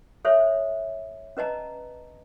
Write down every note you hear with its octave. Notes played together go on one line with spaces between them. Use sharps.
A4 C5 C#5 E5
C#4 B4 D#5 A5 A#5